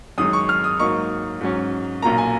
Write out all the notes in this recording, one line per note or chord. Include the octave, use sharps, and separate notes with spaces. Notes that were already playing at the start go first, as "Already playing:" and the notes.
F#2 D#3 G#3 D#6
C#6
F6
D#6
G#2 F#3 A#3 D#4 C#6
G#2 F#3 C#4
B1 A#2 F#3 A#3 A#5
G#5